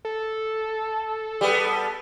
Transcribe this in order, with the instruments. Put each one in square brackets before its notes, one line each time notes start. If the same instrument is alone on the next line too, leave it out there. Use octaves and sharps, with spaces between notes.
[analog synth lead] A4
[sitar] G3 B3